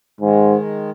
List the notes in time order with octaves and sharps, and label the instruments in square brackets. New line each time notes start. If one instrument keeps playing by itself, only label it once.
[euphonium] G#2 [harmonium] D#3 G#3